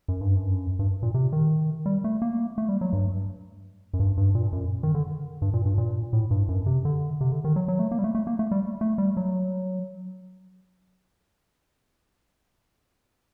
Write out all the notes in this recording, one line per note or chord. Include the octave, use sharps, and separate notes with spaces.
F#2
G2
F#2
G2
A#2
C3
D#3
G3
A3
A#3
A3
G3
F#3
G2
F#2
G2
G2
A#2
F#2
D#3
D3
G2
A#2
G2
A#2
A2
G2
F#2
C3
D3
C3
D3
D#3
F#3
F#3
A3
A#3
G3
A3
A3
A#3
A3
G3
A3
G3
F#3